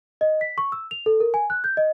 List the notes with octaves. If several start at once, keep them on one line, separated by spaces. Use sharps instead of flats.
D#5
B6
C#6
E6
F7
A4
A#4
G#5
F#6
G6
D#5